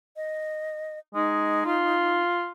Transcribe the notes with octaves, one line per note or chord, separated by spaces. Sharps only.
D#5
G#3 D#4
F4